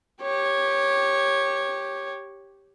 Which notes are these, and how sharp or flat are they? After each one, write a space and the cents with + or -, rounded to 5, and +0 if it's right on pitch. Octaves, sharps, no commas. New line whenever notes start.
G4 +0 C#5 -10